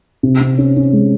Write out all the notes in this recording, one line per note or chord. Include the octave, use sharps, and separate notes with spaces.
C3
C3
C#4
C#4
G#3